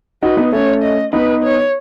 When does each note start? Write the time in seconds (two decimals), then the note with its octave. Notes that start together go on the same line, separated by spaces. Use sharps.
0.22 D#4 F#4 B4
0.37 B3 D#4
0.52 A3 C#4 C#5
0.83 D#5
1.13 B3 D#4 B4
1.43 C#5